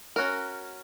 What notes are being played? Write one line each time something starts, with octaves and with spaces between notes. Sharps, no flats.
C#4 F#4 A#4